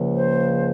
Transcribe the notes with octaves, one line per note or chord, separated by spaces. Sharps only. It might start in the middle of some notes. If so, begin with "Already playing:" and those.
Already playing: C#2 C#3 F3 A#3
C5